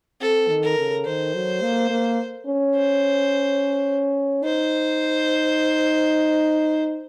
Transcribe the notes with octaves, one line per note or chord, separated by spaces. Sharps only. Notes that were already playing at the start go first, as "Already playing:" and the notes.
C4 A4
D#3
A#4
C#3
D#3 C5
F#3
A#3
A#3
C#4
C5
D#4 C5